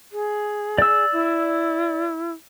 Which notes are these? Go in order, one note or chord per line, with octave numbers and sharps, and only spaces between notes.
G#4
D5 E6
E4